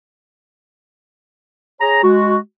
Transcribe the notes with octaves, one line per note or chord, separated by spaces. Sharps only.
G#4 C#5 A#5
G#3 F#4